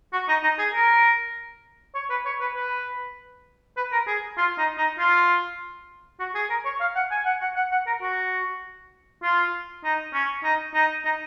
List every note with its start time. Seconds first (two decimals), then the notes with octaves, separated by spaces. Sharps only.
0.13 F#4
0.28 D#4
0.43 D#4
0.59 G#4
0.74 A#4
1.95 C#5
2.10 B4
2.25 C#5
2.41 B4
2.55 B4
3.77 B4
3.92 A#4
4.07 G#4
4.38 F4
4.58 D#4
4.78 D#4
4.99 F4
6.20 F#4
6.35 G#4
6.50 A#4
6.65 C#5
6.80 F5
6.95 F#5
7.11 G#5
7.25 F#5
7.41 F#5
7.56 F#5
7.72 F#5
7.86 A#4
8.02 F#4
9.23 F4
9.84 D#4
10.14 C#4
10.44 D#4
10.74 D#4
11.05 D#4